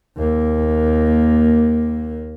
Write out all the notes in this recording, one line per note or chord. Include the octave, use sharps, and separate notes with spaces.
D#2 A#3